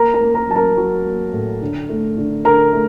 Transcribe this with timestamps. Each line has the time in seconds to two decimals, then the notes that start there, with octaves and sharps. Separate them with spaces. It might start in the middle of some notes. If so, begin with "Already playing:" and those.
Already playing: A#3 A#4 A#5
0.14 A#4 A#5
0.21 A#3
0.34 A#4 A#5
0.49 F#3 A5
0.56 A#4 A#5
0.77 F#3
1.06 A#3
1.33 A2
1.61 D3
1.89 A3
2.17 D3
2.45 D3 A#4 A#5
2.73 A3